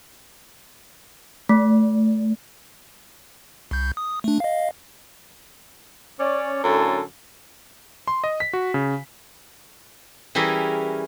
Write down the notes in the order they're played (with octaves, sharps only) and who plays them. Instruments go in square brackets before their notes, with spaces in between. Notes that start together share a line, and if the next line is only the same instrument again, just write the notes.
[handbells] A3
[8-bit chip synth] C2 G6
D#6
A3 D4
D#5 F5
[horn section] C#4 D5
F#2 A2 D3 A4 A5
[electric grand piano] C6
D#5
B6
F#4
C#3
[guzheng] E3 G3 C#4 E4 G#4 A#4